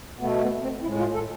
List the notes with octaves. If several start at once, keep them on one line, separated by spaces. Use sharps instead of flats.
B2 A3 B3
B3
C4
A2 G#3 E4
F4
A4